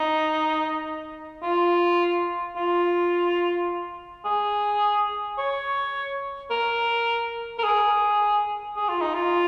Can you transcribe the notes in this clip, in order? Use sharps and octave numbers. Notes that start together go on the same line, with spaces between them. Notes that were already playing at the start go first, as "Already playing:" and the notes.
Already playing: D#4
F4
F4
G#4
C#5
A#4
A#4
G#4
G#4
F4
D#4
F4